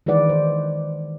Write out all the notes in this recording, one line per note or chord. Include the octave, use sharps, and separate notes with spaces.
D#3 E3 G#3 B4 D5 F#5
C5